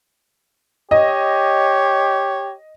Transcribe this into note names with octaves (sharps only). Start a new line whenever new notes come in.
G4 C#5 D#5